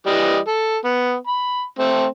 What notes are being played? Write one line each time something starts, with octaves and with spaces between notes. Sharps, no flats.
E3 G3 D#5
A4
B3
B5
A3 C4